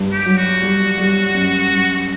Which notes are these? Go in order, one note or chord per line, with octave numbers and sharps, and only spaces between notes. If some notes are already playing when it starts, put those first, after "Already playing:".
Already playing: G2
G4
F#3
F#4
G3
G3
F#2
F#2